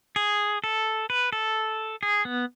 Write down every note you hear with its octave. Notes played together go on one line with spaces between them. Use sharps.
G#4
A4
B4
A4
G#4
B3